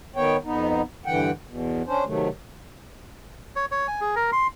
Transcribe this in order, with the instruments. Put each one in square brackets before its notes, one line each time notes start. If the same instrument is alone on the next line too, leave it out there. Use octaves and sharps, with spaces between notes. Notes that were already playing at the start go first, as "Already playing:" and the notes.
[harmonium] D#3 B3 C#5 G5
F2 B3 D#4
G2 D3 E3 F#5 G5
E2 B2
C#4 D4 C5
C3 D#3 F#3 A3
[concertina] C#5
C#5
G#5
G#4
A#4
C6